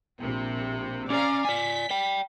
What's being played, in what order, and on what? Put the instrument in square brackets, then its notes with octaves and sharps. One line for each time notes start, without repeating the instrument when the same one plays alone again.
[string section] A#1 C3
[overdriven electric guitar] C#4 [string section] D5 F5 A#5
[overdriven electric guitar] D5 G#5 [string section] B6
[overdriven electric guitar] D5 G5